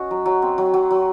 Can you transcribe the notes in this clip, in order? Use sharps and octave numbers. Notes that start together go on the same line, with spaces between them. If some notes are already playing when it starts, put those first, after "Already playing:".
Already playing: C#4 F#4 D#5
F#3
F#3
C4
F#3
F#3
F#3